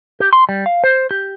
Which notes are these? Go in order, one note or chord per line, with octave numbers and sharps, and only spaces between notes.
G4
C6
G3
F5
C5
G4